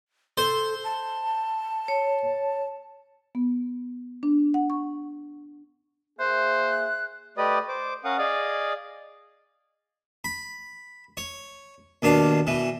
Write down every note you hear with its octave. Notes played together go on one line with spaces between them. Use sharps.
A4 C5
A5
C#5
B3
D4
F#5
C#6
A#3 G#4 C5 E5 F#6
A3 G4 B4 D5 D#5 D#6
C5 D6
C#4 A#4 F5 F#5 D#6
G#4 D5 D#5 F5 D#6
B5
C#5
D#2 B2 D4 F5
B2 E3